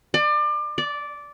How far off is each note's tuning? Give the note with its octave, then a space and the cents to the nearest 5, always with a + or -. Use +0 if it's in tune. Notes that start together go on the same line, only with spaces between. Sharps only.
D5 +30
D5 -10